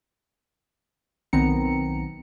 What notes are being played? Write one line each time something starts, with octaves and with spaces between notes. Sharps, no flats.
B1 D#3 B3 C4 A#5 C#7